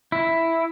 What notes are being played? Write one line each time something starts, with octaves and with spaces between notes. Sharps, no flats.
E4